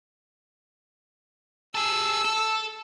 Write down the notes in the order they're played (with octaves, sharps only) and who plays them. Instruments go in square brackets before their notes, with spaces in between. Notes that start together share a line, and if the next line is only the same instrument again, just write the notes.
[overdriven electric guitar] G#4 A4 [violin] E6
[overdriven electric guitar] A4